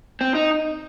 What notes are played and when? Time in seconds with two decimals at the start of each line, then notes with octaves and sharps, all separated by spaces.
0.21 C4
0.35 D#4